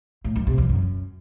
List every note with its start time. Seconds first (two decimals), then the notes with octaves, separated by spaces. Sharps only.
0.24 A2
0.36 F#2
0.47 C3
0.58 E2
0.69 F#2